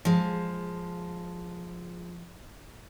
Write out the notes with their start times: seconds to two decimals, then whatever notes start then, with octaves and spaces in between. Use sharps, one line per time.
0.05 F3 G#3